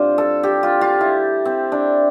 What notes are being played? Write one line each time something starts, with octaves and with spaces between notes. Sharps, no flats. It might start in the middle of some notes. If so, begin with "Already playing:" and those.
Already playing: A2 G3 C4 D4 F4 C5
A4
G4
F4
F4
E4
C4
D4